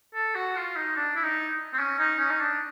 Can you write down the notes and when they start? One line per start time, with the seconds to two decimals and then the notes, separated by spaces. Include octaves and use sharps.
0.14 A4
0.35 F#4
0.56 F4
0.76 D#4
0.96 D4
1.16 E4
1.23 D#4
1.74 C4
1.79 C#4
1.99 D#4
2.19 C#4
2.30 D#4
2.40 D4